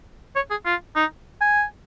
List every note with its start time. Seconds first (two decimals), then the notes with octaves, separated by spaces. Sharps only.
0.36 C#5
0.50 G#4
0.65 F4
0.95 D#4
1.41 G#5